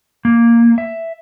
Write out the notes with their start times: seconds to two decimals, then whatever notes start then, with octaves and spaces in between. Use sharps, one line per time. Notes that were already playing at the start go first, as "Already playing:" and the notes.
0.25 A#3
0.78 E5